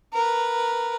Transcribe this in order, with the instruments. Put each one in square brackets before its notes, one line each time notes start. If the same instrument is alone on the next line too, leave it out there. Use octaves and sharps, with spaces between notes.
[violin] A#4 B4